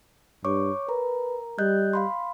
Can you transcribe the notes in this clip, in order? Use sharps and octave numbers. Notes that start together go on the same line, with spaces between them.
G2 C#5 C#6 D6
A#4 B4 A#5
G3 D#5 F#6 G6
F5 B5 C6